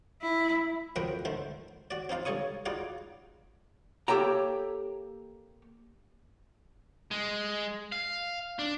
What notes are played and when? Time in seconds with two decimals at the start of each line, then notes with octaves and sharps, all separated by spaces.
0.22 E4
0.96 F2 F3 B3 F#4 A#4 G5
1.25 D3 D#3 A3 C5
1.91 F#4 D5
2.09 C4 D#4 F4 F5
2.25 G2 A4 C#5 C#6 D#6
2.66 D#4 F4 F#4 G#4 D5
4.08 A#3 G4 A4 C#5 G5 A#5
7.11 G#3
7.92 F5
8.59 D4